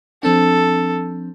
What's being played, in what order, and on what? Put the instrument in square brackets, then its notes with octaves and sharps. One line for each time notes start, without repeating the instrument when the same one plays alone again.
[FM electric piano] F3 C4 D4 [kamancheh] A4